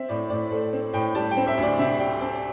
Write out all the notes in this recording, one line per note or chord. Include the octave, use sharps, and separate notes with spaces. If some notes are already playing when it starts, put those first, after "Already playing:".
Already playing: C4 E5
A2 D5
A2 D5
A3 C5
C4
A2 G5
G3 A5
G5
C4
E5
D2 D5
C3 E5
G3 G5
C4 A5